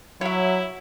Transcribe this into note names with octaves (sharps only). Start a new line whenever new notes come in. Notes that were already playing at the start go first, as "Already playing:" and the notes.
F#3 E4 C#5 E5